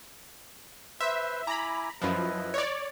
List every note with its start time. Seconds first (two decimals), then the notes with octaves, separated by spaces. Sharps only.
1.01 B4 C5 E5 C6
1.47 E4 G#5 A#5 B5 D6
2.02 F#2 F3 E4 B4 D#5
2.54 C#5 D5